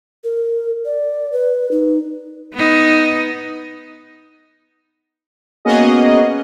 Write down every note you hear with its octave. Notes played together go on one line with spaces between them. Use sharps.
A#4
D5
B4
D#4
B3 D#4
A#3 B3 C#4 F#4 G#4 D#5